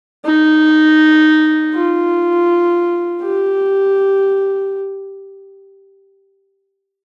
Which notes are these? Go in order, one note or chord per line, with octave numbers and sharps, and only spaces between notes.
D#4
F4
G4